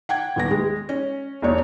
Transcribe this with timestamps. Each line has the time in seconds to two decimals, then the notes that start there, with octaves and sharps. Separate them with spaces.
0.09 F#5 G5 G#6
0.36 D#1 B3 A#6
0.51 G#3
0.89 C#4
1.42 E1 E2 C#5